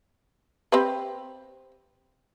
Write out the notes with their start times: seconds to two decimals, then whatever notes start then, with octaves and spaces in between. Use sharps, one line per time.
0.72 C4 G4 B4